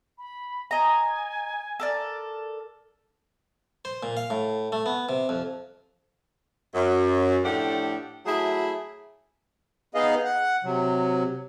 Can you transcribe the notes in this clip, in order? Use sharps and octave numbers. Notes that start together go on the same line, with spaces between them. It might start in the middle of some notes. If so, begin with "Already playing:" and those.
B5
D#5 G#5 A#5
A4 A#4 D5
C5
A#2
F5
A2
A3
B3
C3
F2
F#2
A2 F3 A3 D4 G4 F#5
F#3 A3 E4 G#4
B3 D#4 G#4 D#5 F5
F#5
C3 F#3